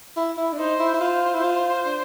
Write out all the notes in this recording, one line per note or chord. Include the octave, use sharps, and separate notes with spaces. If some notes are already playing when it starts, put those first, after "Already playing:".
E4
E4
D4
D#4 C5
E4
E4
F4 C5
E4
F4
D4